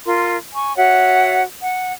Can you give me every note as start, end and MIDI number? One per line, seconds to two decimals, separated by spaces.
0.07 0.37 65
0.07 0.37 70
0.07 0.37 84
0.54 0.76 80
0.54 0.76 85
0.77 1.42 66
0.77 1.42 73
0.77 1.42 76
0.77 1.42 78
1.62 1.91 78